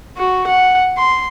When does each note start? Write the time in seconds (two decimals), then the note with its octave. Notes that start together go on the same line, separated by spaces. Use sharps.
0.17 F#4
0.47 F#5
0.97 C6